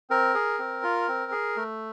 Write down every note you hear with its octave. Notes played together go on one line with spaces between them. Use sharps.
C4 A#4
G#4
C4
F4
C4
G#4
A3